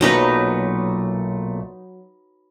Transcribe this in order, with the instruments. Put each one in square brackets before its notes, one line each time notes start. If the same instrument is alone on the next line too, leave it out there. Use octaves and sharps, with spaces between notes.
[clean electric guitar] B1 A#2 A3 [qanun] F#3 D#4 B4